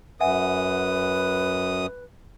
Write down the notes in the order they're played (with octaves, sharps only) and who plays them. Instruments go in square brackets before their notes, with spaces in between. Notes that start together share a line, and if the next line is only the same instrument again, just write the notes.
[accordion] F#2 D#6 [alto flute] B4 [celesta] E5 F#5 G#5